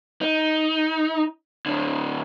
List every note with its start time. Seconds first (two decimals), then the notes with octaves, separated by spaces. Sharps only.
0.21 D#4
1.66 A2 D3